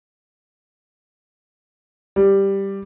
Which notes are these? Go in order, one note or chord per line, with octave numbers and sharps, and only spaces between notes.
G3